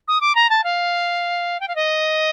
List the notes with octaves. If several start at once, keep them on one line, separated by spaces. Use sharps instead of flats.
D#6
D6
A#5
A5
F5
G5
F5
D#5